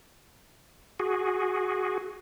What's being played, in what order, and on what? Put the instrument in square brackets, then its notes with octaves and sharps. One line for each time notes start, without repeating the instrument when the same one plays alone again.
[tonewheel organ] F#4 G#4